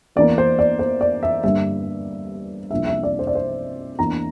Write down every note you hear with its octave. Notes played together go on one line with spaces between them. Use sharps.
E2 E3 A#3 D5
C5
D5
C5
D5
E5
G2 D3 G3 A#3 D4 E5
C2 C3 F3 A#3 D4 E5
E5
D5
C5
D5
C5
E2 E3 A#3 D4 A#5